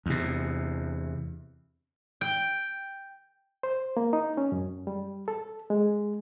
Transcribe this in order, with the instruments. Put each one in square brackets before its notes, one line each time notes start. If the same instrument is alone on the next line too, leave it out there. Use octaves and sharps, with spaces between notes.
[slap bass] E2 C3
[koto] G5
[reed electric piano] C5
A#3
D#4
C#4
F#2
G3
A4
G#3